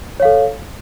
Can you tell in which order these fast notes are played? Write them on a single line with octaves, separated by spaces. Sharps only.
C#5 F5 A4